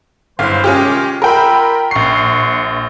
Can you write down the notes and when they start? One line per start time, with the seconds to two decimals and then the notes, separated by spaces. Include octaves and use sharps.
0.39 G1 F#3 E4 C5 F5
0.64 C3 D#3 G#3 C#4 F4 G4
1.22 F4 A#4 E5 G5 B5
1.91 A#1 F#5 C6 C#6 C7